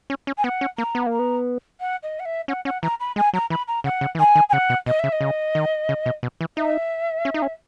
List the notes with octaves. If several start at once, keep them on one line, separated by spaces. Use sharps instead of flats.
C#4
C#4
G#5
B3 F#5
C#4
A#3 A#5
B3
A#3
A#5
B3
F#5
D#5
F#5
E5
C#4 F#5
C#4 F#5
E3 A#5
B5
G#3 G#5
F#3 A#5
E3 B5
A#5
C#3 F#5
C#3
E3
D#3 G#5
D#3
G#5
C#3 F#5
B2
B2 D#5
C#3 E5
D#5
C#3
D#3
C#3
B2
B2
E3
D#4 E5
C#4
D#4
C#4